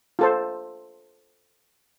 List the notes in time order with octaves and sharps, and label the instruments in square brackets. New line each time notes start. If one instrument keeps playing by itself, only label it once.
[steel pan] F4 A4 C5